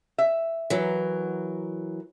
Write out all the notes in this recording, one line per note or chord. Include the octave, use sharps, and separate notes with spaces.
E5
E3 F#3 A#4